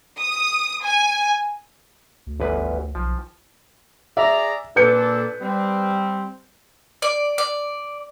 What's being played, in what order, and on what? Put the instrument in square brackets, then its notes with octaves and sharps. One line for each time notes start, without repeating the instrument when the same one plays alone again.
[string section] D#6
G#5
[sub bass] D2
[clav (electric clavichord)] G1 E2 B4
[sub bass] B1 [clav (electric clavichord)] F3
[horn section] G#4 D5 A#5 [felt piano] E5
[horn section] A#2 D4 A4 [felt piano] B4 G6 C#7
[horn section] G3 C4
[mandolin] D5
D5